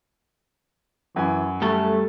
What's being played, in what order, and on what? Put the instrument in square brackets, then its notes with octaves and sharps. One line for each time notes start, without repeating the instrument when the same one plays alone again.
[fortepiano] F#2 G#5 [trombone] E3
[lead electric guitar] G3 A4 [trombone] A3